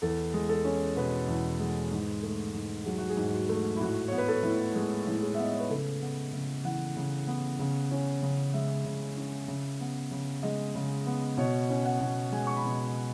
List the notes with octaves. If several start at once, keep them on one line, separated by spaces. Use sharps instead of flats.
E2 A4
G#3
A4
C#4
B2 B4
E2
G#3
G#2
A3
G#2
F#3 G#4
F#4
G#4
G#2
F#4
A3
E4
A2 F#4
B3 C#5
B4
A4
A2
G#3
A2
G#4
E5
B3 D#5
C#5
B4
C#3 A4
B3
C#3
E3 F#5
C#3
B3
C#3
C#4
C#3
G#3 E5
C#3
C#4
C#3
B3
C#3
G#3 D#5
C#3
B3
B2 C#5
C#4
F#5
B2
G#3 G#5
C#6
B5
B2